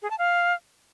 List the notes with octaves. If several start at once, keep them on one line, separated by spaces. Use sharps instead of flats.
G#4
A5
F5